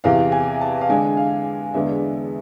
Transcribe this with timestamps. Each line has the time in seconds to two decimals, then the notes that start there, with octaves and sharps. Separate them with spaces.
0.04 E2 C3 E3 F5
0.32 G#5
0.61 A5
0.81 F5
0.89 D3 G#3 D4 G#5
1.17 F5
1.74 E2 D3 G#3 B3 D4 E5